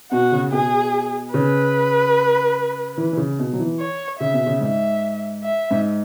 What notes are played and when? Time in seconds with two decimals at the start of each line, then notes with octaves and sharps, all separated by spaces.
0.11 B2 F#4
0.32 C#3
0.52 B2 G#4
1.34 C#3 B4
2.97 E3
3.13 E3
3.17 C#3
3.39 B2
3.53 F#3
3.59 E3
3.80 C#5
4.20 C#3 E5
4.33 B2
4.47 C#3
4.61 G#2 E5
5.43 E5
5.71 G#2